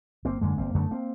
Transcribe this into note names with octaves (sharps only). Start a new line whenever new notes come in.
G1 A#3 C4
F#2 D3 G#3 A#3
G1 A#3 C4
F#2 D3 A3 B3
A#3 C4